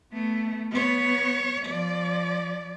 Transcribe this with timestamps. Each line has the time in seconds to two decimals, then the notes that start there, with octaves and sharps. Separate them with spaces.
0.12 A3 B3
0.71 B3 C#5
1.66 F3 D5